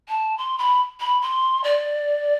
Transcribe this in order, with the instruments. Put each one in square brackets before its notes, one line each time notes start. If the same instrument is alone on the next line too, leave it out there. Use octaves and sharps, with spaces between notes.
[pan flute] A5
C6
B5
B5
C6
D5